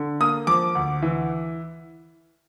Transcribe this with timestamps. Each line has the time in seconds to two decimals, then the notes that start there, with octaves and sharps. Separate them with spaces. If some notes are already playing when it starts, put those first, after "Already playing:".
Already playing: D3
0.20 A#3 D#6
0.47 F3 D6
0.75 D2
1.02 E3